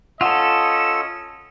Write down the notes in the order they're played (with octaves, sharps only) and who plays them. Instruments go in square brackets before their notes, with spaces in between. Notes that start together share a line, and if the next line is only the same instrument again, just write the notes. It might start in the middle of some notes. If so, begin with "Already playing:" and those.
[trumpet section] C#4 D#5 [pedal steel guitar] F4 A4 [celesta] F#5 [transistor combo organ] E6